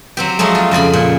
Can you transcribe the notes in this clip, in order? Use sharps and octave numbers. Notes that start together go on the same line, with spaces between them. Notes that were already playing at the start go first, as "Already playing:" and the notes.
F#3 C4 G4
F3 F#3 G#3 A3
F4
F2 C#3 G#5 B5
A#2